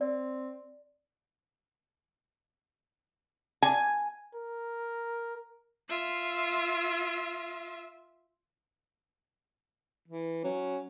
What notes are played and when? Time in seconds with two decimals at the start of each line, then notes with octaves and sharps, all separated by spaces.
0.01 C4 D5
3.63 G#5
4.35 A#4
5.89 F4 E5
10.08 E3
10.44 F#3 C#4